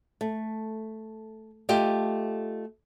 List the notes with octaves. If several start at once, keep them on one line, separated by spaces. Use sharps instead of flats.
A3
A3 F4 G4 D#5